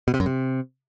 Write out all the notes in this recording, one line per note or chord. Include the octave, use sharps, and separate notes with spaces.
B2
C3
F#2
C3